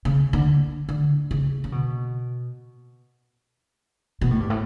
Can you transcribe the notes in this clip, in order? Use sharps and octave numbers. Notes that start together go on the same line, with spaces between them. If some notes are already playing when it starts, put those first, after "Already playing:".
C#3
D3
D3
C#3
C#3
B2
B2
A2
G2
A2